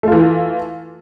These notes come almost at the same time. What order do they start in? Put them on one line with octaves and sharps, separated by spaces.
A3 F4 E3